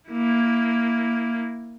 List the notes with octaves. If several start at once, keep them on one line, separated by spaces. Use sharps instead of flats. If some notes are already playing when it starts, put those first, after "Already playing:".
A#3 E4